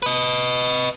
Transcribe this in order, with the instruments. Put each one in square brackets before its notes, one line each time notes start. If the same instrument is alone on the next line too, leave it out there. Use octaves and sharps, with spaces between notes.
[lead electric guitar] B4 D#5